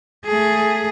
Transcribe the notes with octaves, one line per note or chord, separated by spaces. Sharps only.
A3 G#4